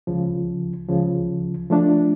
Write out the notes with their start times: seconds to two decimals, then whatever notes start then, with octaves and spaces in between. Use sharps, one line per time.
0.07 C#2 C#3 F3
0.89 C#2 C#3 F3
1.70 F3 A3 D4